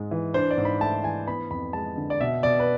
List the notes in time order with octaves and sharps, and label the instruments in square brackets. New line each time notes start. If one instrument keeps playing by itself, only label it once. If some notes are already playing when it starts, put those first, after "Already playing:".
Already playing: [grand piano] G#2 G#3
E3
D4 C5
D5
G#2
B5
A3 A5
E3 G#5
B3 B5
F2 B5
G#3 A5
D3
D5
B2 E5
B2 D5
B4